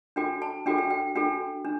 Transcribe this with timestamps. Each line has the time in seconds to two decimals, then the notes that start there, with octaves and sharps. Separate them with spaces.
0.16 D4 F#4 A4 G5
0.42 A5
0.66 D4 F#4 A4 G5
0.78 G5
0.90 G5
1.15 D4 F#4 A4 G5
1.65 D4